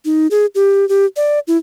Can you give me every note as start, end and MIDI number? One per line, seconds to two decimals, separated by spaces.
0.05 0.27 63
0.31 0.46 68
0.55 0.88 67
0.89 1.05 67
1.16 1.39 74
1.48 1.57 64